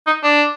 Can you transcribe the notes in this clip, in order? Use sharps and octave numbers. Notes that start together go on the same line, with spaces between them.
D#4
D4